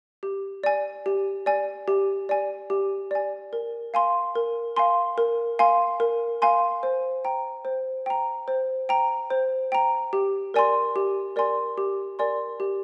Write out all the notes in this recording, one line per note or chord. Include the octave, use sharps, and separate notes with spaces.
G4
D5 G#5
G4
D5 G#5
G4
D5 G#5
G4
D5 G#5
A#4
F5 G#5 C6
A#4
F5 G#5 C6
A#4
F5 G#5 C6
A#4
F5 G#5 C6
C5
G5 A#5
C5
G5 A#5
C5
G5 A#5
C5
G5 A#5
G4
A#4 D5 G#5 C6
G4
A#4 D5 G#5 C6
G4
A#4 D5 G#5 C6
G4